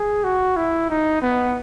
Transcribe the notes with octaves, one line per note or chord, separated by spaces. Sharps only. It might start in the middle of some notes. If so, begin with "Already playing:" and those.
Already playing: G#4
F#4
E4
D#4
B3